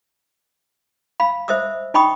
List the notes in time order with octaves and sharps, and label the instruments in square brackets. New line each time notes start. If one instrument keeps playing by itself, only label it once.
[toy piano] F5 B5
C5 D#5 E5 D#6 E6
D#4 D#5 G5 B5 C#6 D#6